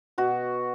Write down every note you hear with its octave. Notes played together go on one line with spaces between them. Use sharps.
B2 F#4